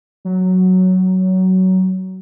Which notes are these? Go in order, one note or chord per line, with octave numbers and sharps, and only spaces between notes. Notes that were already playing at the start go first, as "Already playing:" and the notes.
F#3